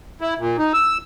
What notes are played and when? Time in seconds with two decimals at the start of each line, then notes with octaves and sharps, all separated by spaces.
0.21 E4
0.39 A#2
0.58 D#4
0.74 E6